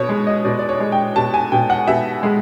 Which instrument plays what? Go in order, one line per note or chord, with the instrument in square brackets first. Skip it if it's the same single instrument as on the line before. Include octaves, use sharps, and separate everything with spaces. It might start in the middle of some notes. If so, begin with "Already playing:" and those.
Already playing: [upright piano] B2 C#5
G#3
D#5
B2 D5
D5
C#5
G#3
G5
B2 A5
G#5
B2 G5
F#5
B2 E5
G#3